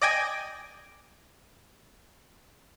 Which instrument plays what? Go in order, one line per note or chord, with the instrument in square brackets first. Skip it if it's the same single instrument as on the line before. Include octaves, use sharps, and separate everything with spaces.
[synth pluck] D5 D#5 G5 G#5